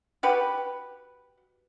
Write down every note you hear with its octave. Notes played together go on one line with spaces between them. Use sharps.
F#4 G4 B4